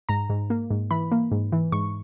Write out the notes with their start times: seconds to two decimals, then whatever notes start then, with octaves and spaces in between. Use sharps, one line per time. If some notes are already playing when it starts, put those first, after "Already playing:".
0.09 G#2 A#5
0.29 G#2
0.50 A#3
0.70 G#2
0.91 E3 B5
1.12 A#3
1.32 G#2
1.52 E3
1.72 G#2 C#6